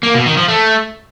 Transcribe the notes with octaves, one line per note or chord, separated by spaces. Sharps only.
A#3
B2
D#3
F3
A3